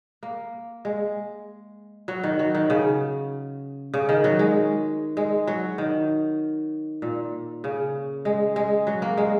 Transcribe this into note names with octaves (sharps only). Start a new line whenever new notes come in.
A#3
G#3
F#3
D#3
F#3
D#3
C#3
C#3
D#3
F#3
G#3
G#3
F#3
D#3
A#2
C#3
G#3
G#3
F#3
A#3
G#3